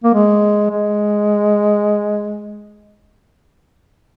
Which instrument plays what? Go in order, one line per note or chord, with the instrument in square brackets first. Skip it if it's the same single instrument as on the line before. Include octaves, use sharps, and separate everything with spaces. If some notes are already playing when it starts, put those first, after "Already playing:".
[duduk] A#3
G#3
G#3